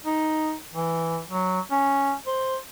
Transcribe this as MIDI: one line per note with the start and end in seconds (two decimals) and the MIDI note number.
0.05 0.54 63
0.73 1.21 52
1.31 1.60 54
1.71 2.14 61
2.27 2.57 72